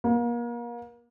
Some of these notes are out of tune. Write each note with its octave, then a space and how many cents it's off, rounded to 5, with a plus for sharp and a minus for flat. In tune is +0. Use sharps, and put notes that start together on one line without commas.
A#3 +35